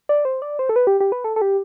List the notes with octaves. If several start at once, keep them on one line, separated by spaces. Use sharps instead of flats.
D5
C5
D5
C5
A4
B4
G4
G4
B4
A4
A4
G4